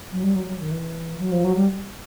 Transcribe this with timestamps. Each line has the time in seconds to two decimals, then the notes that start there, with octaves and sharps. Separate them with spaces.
0.12 F#3
0.23 G3
0.35 F#3
0.47 F#3
0.59 D#3
0.71 E3
1.19 F#3
1.31 F3
1.44 F#3
1.55 G3